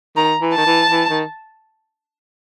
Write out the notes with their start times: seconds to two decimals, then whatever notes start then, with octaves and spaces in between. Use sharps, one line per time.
0.17 D#3 A#5
0.42 E3
0.53 D#3 A5
0.66 E3
0.91 E3
1.10 D#3